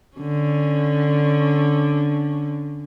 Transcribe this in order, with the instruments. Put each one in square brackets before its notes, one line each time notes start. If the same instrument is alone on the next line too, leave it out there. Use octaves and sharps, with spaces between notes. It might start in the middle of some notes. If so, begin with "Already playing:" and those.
[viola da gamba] D3 C#4